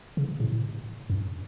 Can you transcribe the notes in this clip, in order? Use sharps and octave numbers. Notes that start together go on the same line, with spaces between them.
C#3
A2
F#2